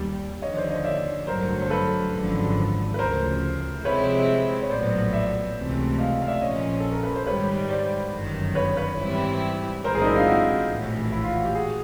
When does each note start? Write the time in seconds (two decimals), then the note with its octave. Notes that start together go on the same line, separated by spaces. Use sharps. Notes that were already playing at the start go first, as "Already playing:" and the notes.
Already playing: D#2 G3
0.42 D#2 D3 F3 C#5 D#5
0.56 C5 D5
0.70 C#5 D#5
0.84 D5 E5
1.27 A1 G2 D3 F#3 A#4 C5
1.62 C5
1.70 A4 B4
2.13 G#1 F#2 D3 F3
2.94 B4
2.98 D2 C#3 F3 A#4 C5
3.84 C3 F3 G#3 C4 E4 B4 C#5
4.62 C#5
4.70 A#1 A2 F#3 B3 C5 D5
5.13 D5 E5
5.56 C#2 C3 E3 A3
5.98 D#5 F5
6.22 F5
6.27 D5 E5
6.41 A#1 A#2 F3 A#3 C#4 C#5 D#5
6.80 A4
6.92 A#4
7.03 B4
7.15 C5
7.27 G#2 D#3 G3 B4 C#5
7.70 C5 D5
8.13 G1 F#2 D#3
8.55 B4 C#5
8.77 B4 C#5
8.98 G#2 E3 G3 C4 E4
9.84 B1 A2 E3 G#3 C4 A#4 C5
9.95 G#4 A#4
10.02 D#4
10.05 D4 E4
10.16 D#4 F4
10.27 E4 F#4
10.69 A#1 A2 E3
11.12 E4
11.23 F4
11.34 F#4
11.45 G4
11.55 F#4 G#4